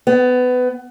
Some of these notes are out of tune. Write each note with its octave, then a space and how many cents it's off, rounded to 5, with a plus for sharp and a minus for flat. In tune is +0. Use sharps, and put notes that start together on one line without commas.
B3 +20